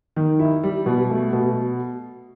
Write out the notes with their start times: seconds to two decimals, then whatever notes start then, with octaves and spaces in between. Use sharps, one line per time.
0.16 D#3
0.39 E4
0.63 G3
0.86 B2
1.10 A3
1.33 B2